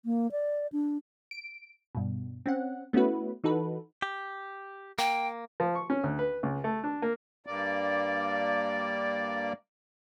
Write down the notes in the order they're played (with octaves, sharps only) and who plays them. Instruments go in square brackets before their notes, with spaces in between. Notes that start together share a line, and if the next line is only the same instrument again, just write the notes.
[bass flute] A#3
D5
D4
[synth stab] D7
G2 B2
C4 C#4 F#5
A3 B3 C#4 E4 F#4 B4
E3 D#4 F#4 A4 B4
[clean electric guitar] G4
[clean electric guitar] A#3 [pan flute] G5
[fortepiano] F3
C#6
C#4
D2
B4
C#2
A3
D4
A#3
[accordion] G2 A#3 D5